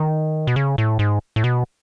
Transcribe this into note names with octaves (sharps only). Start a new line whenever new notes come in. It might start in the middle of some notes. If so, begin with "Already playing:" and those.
Already playing: D#3
B2
C#3
A2
G#2
A2
B2